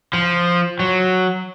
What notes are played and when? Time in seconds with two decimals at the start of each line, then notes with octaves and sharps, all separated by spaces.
0.13 F3
0.80 F#3